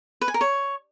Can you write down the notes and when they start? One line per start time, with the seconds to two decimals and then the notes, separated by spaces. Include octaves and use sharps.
0.21 B4
0.28 G#5
0.34 A#4
0.41 C#5